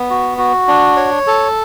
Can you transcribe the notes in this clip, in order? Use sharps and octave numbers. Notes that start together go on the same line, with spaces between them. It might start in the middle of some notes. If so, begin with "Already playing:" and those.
Already playing: B3
F#4
F#4
D4
C#5
A4